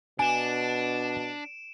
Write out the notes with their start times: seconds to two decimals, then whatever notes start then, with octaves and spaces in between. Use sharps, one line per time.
0.19 B2 D4 G#5 D7 E7